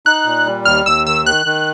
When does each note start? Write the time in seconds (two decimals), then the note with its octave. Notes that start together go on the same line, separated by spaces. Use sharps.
0.06 D#4 F#6
0.26 A#2
0.46 G3
0.65 D#2 F6
0.86 D#2 E6
1.07 D#3 E6
1.26 D#3 F#6
1.46 D#3